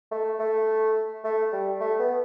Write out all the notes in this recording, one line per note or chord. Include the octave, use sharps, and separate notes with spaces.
A3
A3
A3
G3
A3
B3